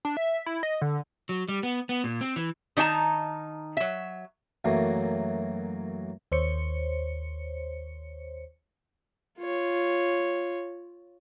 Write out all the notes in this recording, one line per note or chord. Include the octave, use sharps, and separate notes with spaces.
D4
E5
E4
D#5
D3
F#3
G3
B3
B3
A#2
C4
E3
D#3 D4 D#4 A5 A#5
F#3 E5
F#2 E3 F#3 A3 A#3
D#2 C5 C#5 C#7
F4 C#5